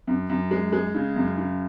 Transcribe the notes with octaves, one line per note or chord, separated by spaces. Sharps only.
F#2
F#2
G#3
G#3
C#3
F#2
C#3